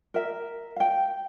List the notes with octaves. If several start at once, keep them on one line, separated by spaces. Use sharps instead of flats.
A#4 E5
F5 G5